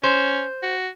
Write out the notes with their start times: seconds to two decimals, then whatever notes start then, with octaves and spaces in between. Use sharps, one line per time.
0.03 C#4 C5
0.63 F#4